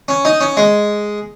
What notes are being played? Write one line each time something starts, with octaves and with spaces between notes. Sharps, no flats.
C#4
D#4
C#4
G#3